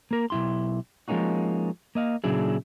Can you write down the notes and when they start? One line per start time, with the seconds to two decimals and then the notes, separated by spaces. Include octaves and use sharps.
0.11 A#3 A#4
0.30 B1 G2 E4 G4 C6
1.08 F3 G#3 A#3 C#4 D#4 F#4
1.95 A#3 D#5 F5
2.24 A#2 C#3 F#3 D4 E4 G#4